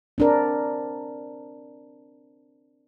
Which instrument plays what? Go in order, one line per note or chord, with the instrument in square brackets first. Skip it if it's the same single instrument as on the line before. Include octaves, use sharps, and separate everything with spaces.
[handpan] C4 D4 A#4